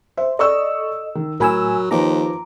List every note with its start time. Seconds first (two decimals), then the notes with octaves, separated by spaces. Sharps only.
0.17 C5 E5
0.39 A4 D5 D#5 C#6 E6
1.15 D#3
1.40 A2 F#3 A#4 G#5 B5 E6
1.91 D#2 F3 B4 A#5 D6